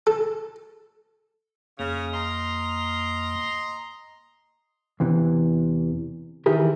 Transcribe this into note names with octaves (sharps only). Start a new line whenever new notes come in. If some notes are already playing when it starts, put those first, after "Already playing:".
A4
F2 C#3 A#3
D#5 A#5 C6
E2 C3 E3
D#3 E3 E4 G4 G#4 A#4